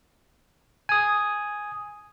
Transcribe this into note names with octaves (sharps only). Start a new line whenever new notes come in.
G#5 D#6